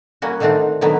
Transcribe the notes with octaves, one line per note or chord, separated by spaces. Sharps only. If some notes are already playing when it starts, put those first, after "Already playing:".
G3 A#3 C#4 F#4
D3 D#3 A3 C4 D4 D#4
D3 D#3 F#3 B3